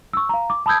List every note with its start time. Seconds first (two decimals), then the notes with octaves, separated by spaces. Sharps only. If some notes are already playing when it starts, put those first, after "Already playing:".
0.13 C#6 E6
0.29 F5 A#5
0.50 D6
0.66 A5 B5 D#6 E6 G6 G#6